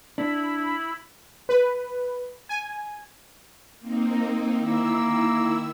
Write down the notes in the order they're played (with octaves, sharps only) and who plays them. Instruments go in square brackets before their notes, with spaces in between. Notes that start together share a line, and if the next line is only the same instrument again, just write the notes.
[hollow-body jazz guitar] D4 [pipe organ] E4 B5
[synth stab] B4
G#5
[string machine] A#3 C4 D#4
[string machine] D#3 E4 E6 [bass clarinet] A#3